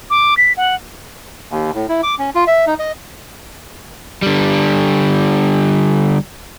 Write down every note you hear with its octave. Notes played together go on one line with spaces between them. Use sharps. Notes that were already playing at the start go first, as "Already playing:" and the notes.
D6
B6
F#5
D#2
A2
E4
D6
C#4
F4
E5
D#4
D#5
D3 G3